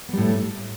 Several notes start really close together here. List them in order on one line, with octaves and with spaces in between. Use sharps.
B3 G3 A2 A3